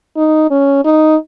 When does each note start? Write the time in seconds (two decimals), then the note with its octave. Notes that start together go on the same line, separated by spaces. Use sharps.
0.17 D#4
0.51 C#4
0.85 D#4